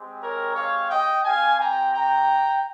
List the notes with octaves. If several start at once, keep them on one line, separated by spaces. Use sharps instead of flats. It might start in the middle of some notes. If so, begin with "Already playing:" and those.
Already playing: G#3 C4 G4
A#4 C#5
C#5 F5
D#5 G5
C4 G4 F5 G#5
G5 A#5
G5 A#5